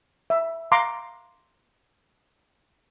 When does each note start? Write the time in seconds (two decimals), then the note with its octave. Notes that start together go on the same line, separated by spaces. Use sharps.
0.30 E5
0.72 F5 A#5 C6 D6